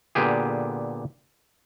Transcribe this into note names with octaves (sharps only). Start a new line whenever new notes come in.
A#2 D3 B3 G4 G#4